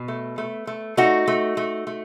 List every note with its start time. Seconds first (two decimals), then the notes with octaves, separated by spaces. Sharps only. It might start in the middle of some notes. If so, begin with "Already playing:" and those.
Already playing: B2
0.08 A3
0.38 A3
0.67 A3
0.97 A3 D#4 F#4
1.28 A3
1.57 A3
1.87 A3